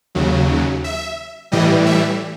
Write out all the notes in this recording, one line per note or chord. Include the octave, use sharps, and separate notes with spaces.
D#2 C#3 F#3
E5
A2 E3 G3 D#5
E5